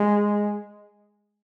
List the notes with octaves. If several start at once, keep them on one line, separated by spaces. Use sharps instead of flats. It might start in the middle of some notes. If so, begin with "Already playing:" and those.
Already playing: G#3